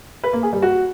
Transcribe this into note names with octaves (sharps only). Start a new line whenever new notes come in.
B4
A#3
G#4
G3
F#4